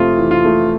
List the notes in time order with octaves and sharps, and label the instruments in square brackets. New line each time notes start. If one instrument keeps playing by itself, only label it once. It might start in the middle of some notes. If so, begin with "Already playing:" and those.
Already playing: [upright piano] F2 C3 A3 [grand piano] F4
[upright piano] E3
[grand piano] F4
[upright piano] A3